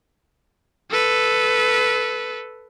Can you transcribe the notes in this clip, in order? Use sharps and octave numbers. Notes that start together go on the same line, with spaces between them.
A4 B4